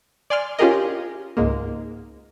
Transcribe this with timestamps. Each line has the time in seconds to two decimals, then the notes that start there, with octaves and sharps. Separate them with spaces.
0.30 D5 G#5 C6 F6
0.59 C#4 F4 G4 G#4 A#4 D#5
1.37 C#2 G#2 G#3 A#3